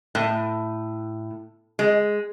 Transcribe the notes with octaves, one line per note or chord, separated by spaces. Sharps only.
A2
G#3